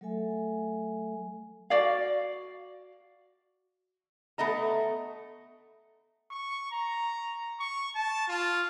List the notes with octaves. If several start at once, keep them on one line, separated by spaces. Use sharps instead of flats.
F#3 A3 A4 E5 G#5
F#4 D5 F5
A3 B3 D#5 A#5
C#6
A#5
C#6
A5
F4